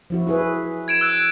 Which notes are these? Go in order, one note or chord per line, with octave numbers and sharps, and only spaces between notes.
F3 E4 F#4
E4 G#4 B4
G#6 D7 E7
E6 F#6